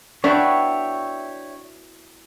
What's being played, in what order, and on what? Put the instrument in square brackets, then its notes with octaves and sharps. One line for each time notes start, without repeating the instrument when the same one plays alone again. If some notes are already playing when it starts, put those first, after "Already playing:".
[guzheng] B3 E4 F#4 [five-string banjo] D4 [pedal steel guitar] C#5 E5 G5